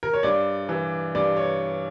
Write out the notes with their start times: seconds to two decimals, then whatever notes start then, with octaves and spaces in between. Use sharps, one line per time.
0.03 A#4
0.13 C#5
0.23 G2 D5
0.69 E3
1.15 G2 D5
1.37 C#5